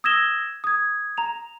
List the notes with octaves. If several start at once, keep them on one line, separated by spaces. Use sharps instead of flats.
D#6 E6 G#6 A#6 E7 G7
D#6 G#6
A#5 F7